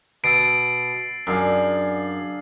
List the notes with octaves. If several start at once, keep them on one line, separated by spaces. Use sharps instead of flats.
B2 D#6 E6 A6 C7 D7
F#2 D4 G#4 F5 E6 C7